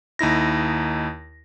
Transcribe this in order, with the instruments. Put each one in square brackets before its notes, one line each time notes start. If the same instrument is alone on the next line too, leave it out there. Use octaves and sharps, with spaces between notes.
[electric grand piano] D#2 D#4 E4 A#6